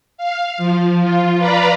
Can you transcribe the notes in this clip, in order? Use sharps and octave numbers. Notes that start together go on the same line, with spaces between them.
F5
F3
F4
B4 D5 F5 A#5 B5